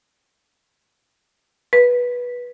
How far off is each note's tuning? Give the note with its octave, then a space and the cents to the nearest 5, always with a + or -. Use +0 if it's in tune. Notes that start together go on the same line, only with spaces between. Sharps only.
B4 -15